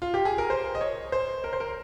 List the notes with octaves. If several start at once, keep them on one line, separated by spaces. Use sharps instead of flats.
F4
G4
G#4
A#4
C5
D#5
C#5
C5
A#4
C5
A#4